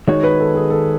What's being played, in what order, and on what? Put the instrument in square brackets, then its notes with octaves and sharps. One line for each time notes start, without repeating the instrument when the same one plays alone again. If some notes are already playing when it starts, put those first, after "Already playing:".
[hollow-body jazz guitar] D#3 G#3 D#4 F#4 [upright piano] C#5
[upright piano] B4
A4
G#4
A4